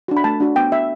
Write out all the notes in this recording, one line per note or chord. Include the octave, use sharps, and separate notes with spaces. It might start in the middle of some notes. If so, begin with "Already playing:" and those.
D4 F#4
B5
A3 A5
D4 F#4
B3 G5
F#4 E5